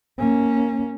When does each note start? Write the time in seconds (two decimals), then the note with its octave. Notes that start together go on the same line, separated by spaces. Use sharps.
0.18 A#3 C#4